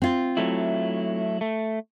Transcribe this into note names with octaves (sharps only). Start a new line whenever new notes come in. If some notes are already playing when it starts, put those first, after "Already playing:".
C4 F4
F#3 A3 E4
A3